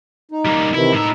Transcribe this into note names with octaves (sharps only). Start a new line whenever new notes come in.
D#4
G3 A#3
C3 D#3 E3 E4
A2 D#4 E5